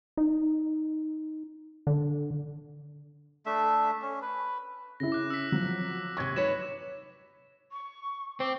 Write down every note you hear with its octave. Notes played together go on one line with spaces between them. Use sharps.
D#4
D3
A3 D4 E5
C#4
B4
C#3 E4 A#6
D6 F#6
E6 B6
F3 F#3
D#2 C3 C#6 G#6
D#4 B4 C#5 E7
C#6
C4 D6